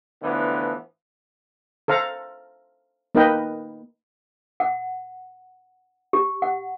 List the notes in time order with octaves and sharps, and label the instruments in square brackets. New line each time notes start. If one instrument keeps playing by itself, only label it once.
[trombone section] A2 D3 E3 F3 B3
[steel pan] A4 C5 F5 A#5
A#3 D#4 A#4 B4 D#5 G5
[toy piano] F#5
G4
F#5